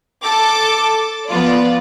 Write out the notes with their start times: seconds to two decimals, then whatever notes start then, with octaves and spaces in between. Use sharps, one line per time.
0.24 A4 A5 D6
1.28 F3 B3 F4 D5